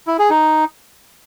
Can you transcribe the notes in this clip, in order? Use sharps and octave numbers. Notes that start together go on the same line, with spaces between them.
E4
G#4
D#4